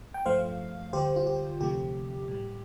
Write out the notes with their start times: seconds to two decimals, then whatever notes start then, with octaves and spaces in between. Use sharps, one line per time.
0.14 G5
0.25 G2 F3 A3 C5 F5
0.93 D2 D3 G3 G4 C5
1.16 F4
1.27 G4
1.60 D2 C3 F3 A3 G4
2.28 A2 G3